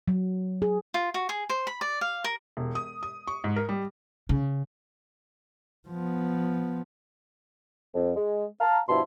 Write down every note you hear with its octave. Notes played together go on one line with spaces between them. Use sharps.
F#3
G#4
F4
F#4
G#4
C5
B5
D5
F5
A#4
E1
D#6
D#6
C#6
G#2
A#4
G3
C#3
F3 B3
F2
G#3
F5 A5 A#5
G2 B2 F3 E4 A5 C6